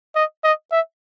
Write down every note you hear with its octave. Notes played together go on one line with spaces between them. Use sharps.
D#5
D#5
E5